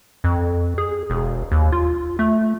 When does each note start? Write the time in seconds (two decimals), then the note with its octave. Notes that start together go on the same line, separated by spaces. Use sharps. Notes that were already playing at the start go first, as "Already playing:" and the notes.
0.24 F2
0.78 G#4
1.10 E1
1.52 D#2
1.72 F4
2.19 A3